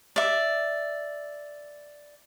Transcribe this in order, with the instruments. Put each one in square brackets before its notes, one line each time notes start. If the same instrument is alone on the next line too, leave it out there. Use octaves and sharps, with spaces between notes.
[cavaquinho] D5 E5